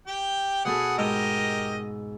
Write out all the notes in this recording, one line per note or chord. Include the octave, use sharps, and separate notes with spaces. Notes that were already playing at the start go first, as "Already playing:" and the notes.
G4 G5
B2 B3 G#4 A4 F#5
G#2 G4 A#4 D#5 E6 F6